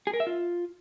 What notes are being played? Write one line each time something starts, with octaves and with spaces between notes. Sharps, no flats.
G#4
A#4
E5
F4